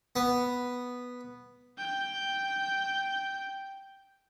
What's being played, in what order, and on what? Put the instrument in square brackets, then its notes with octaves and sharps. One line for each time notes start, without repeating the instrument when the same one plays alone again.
[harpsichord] B3
[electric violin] G5 G6